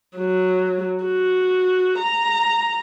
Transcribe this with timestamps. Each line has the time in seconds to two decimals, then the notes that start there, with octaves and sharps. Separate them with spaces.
0.17 F#3
1.05 F#4
1.99 A#5